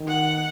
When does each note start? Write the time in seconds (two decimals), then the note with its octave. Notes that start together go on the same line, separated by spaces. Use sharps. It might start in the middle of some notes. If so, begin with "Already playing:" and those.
Already playing: D#3
0.08 F#5